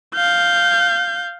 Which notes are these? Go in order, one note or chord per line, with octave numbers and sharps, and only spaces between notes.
F5 G6